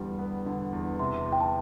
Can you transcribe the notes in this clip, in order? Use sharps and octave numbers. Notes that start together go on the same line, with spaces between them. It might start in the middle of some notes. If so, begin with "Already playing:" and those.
Already playing: E2 D3 G3
B3
D3
E2
C3 C6
E2
G5
A5